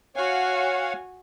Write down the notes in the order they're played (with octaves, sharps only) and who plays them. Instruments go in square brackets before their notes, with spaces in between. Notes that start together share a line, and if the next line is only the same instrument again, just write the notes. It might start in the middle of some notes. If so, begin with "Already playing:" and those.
[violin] F#4 G#5 [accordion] C#5 F5 F#5